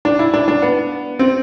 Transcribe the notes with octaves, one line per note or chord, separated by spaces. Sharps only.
D4
E4
D4
D4
B3
C4